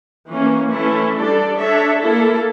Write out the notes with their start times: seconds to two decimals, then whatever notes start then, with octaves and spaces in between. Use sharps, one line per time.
0.29 E3 A#3 C#4
0.72 E3 A3 C#4 E4 A4
1.15 G3 D4 A4 D5
1.57 D4 A4 C#5 E5
2.00 A#3 E4 A4